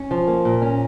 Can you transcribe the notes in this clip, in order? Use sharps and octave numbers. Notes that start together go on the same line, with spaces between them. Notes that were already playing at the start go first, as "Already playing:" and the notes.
Already playing: C#4
F3
A#3
A#2
C#4